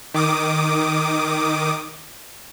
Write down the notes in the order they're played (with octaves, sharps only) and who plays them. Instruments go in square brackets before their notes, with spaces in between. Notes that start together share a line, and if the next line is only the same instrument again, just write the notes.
[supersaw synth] D#3 D6 D#6